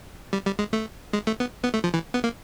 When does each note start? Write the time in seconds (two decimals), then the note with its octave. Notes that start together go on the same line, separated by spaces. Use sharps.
0.33 G3
0.46 G3
0.59 G#3
0.73 A3
1.13 G#3
1.27 A3
1.40 B3
1.64 B3
1.74 A3
1.84 F3
1.94 E3
2.14 B3
2.24 A#3